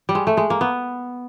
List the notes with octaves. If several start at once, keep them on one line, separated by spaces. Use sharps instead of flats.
G3
G#3
A3
G#3
A#3
B3